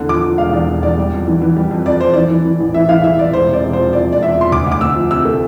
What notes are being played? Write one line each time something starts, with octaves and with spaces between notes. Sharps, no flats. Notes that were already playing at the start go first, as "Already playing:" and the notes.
Already playing: E2 D3
F3 D6
F3
E1 F5
E2 D5
E2
E2 D5
G3
F2
E3
E3
G3
F2
F2 D5
F2 C5
E3 D5
E3
E3
A1
E3 E5
E3 F5
E3 E5
E3 D5
E1 C5
C3 D5
E1
C5
F3
F3 D5
E1
D5
E2 E5
F3 C6
D2 D6
D2
D6
D2 E6
F3
C3 E6
A3